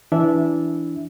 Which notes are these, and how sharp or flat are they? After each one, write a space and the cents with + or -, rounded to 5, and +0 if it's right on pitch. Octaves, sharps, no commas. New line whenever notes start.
E3 +0 D4 -20 E5 -10